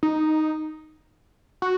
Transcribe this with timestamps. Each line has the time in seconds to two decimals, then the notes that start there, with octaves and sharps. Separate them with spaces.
0.03 D#4
1.62 F#4